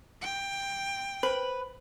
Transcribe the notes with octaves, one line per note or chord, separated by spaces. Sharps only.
G5
B4 C5 F#7